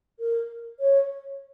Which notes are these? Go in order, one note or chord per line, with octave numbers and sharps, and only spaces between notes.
A#4
C#5